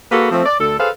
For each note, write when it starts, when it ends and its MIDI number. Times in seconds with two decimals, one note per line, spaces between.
0.12 0.29 58
0.12 0.29 66
0.12 0.29 68
0.12 0.29 69
0.12 0.29 71
0.31 0.43 53
0.31 0.43 57
0.31 0.43 60
0.46 0.57 74
0.59 0.79 38
0.59 0.79 50
0.59 0.79 69
0.80 0.89 68
0.80 0.89 69
0.80 0.89 71
0.80 0.89 72
0.80 0.89 77